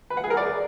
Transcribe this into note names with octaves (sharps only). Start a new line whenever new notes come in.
B4
F#5
G#4
A#4
D5